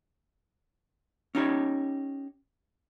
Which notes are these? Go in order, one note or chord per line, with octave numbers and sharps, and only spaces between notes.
C#4 D#4 G4 C#5